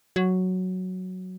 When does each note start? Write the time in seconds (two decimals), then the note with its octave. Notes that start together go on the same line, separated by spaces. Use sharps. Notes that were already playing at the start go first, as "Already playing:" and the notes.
0.16 F#3